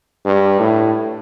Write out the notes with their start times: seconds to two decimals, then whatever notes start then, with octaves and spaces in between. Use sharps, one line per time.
0.25 G2
0.60 A2